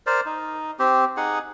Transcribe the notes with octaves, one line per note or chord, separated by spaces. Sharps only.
A#4 C5 D5
D#4
C4 G4
D#4 G#4 F#5